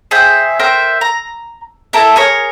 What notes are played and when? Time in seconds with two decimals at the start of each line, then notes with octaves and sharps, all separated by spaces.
0.11 G#4 C5 E5 G5
0.60 A#4 C5 E5 G5
1.01 A#5
1.93 E4 A4 A#4 E5
2.16 G#4 A#4 C#5